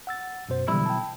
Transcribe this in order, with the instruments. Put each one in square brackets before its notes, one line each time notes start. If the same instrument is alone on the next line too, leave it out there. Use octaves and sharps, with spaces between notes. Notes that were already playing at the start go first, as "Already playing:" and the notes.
[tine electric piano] F#5 E6 A6
F#2 B2 C5
[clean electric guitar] B1 E4 [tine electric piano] D3 E3 G3
[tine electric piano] G5 A5